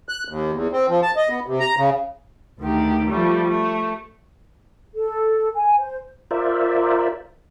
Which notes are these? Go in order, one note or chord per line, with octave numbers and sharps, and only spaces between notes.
F#6
D#2
E2
C4
F3
A5
D#5
B3
C3
A#5
C#3
D2 D#3 G4
F3 G3 A3
A3
A4
G#5
C5
F4 A#4 C5 D5 E5